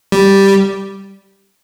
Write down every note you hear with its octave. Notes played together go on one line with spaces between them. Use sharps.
G3